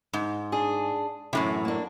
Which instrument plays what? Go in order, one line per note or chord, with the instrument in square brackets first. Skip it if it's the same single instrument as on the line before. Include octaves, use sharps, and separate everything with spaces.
[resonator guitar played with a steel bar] G#2
[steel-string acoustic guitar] D4 G#4
[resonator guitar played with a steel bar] F#2 A2 C3 [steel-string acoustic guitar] E3
[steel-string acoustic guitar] A#3 D4